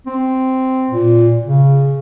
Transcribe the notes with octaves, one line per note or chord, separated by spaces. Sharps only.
C4
A#2
C#3